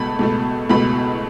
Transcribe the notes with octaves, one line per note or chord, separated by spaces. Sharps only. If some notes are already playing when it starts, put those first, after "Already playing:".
Already playing: C#2 B2 A3 A5 B5
C#2 B2 A3
C#2 B2 A3 B5